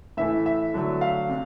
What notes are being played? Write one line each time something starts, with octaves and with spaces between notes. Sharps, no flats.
A2 E3 A3 E5
E5
D3 F#3 A3
F5
C3